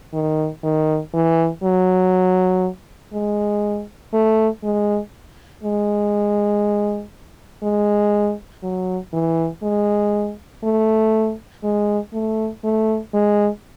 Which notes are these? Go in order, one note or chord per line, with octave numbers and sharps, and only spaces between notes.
D#3
D#3
E3
F#3
G#3
A3
G#3
G#3
G#3
F#3
E3
G#3
A3
G#3
A3
A3
G#3